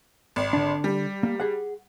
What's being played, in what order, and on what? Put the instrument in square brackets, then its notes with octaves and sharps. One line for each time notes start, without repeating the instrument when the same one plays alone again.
[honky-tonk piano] G#1
[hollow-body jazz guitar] D3 D4
[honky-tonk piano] G3
[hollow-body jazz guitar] A#3
G#4 F#5